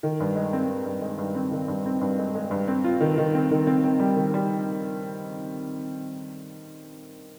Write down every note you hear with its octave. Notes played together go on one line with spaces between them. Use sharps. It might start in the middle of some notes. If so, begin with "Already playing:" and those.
D#3
G2
G#3
C4
C4
G2
G#3
G2
C4
D#3
G2
C4
G2
G#3
G#3
G2
C4
F4
D#3
D#3
C4
D#3
C4
C4
G3
D#3
G3